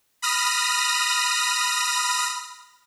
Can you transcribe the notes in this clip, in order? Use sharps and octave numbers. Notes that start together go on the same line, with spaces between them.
B5 D#6 F6 A#6